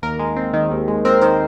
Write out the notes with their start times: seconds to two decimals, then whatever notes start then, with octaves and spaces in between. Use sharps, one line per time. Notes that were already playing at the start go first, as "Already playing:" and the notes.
0.02 D#2 A#4
0.19 G#3
0.36 C4
0.53 D#3
0.71 D#2
0.88 G#3
1.05 C4 A#4
1.21 D#3 C5